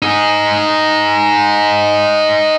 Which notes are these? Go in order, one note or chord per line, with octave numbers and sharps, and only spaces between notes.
D#4 G#4